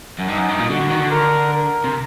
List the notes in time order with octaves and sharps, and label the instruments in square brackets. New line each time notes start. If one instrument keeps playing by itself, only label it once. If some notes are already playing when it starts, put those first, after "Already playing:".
[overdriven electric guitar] F#2
[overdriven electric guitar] G2 [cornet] D#4
[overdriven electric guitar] F#2
G2
A#2
[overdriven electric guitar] D3 [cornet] F#4
[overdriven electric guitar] D3
D#3
D3
[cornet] A#4
A#4
[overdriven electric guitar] C3